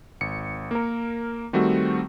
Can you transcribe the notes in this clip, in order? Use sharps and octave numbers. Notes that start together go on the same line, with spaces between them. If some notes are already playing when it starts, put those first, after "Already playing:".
G#1 C#7
A#3 A#4
D#3 G3 A3 C4 F#4